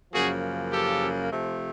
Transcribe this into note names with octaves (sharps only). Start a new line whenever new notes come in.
F#2 C#3 F3 A#3 F#4 G#4
G4 A4
C3 F3 A3